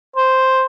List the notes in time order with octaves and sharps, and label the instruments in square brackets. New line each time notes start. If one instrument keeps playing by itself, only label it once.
[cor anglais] C5